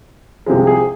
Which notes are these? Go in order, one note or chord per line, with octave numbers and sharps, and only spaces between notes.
C2 C3 F3 G#3
G#4